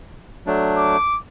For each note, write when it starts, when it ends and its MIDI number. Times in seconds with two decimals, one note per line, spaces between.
0.47 0.97 54
0.47 0.97 57
0.47 0.97 62
0.77 1.17 86